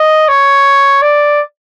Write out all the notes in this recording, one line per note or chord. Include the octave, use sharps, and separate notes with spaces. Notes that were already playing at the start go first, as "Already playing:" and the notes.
Already playing: D#5
C#5
D5